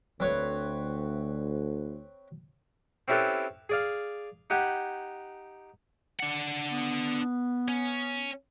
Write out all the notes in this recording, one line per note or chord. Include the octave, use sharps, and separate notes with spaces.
D2 C4 B4 C#5
C4 C#4 E4 G4 A4 B4
G#4 D5 F5
D#4 G4 F#5 G#5 B5
D4 F#5
B3
C#4